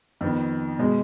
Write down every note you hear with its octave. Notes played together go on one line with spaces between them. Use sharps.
F2 D#3 B3
B2 G#3